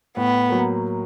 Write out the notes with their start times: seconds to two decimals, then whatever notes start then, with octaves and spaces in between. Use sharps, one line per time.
0.17 A2 B3
0.49 F#3 A#3